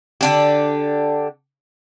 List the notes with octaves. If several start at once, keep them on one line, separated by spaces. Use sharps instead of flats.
D3 D4 G4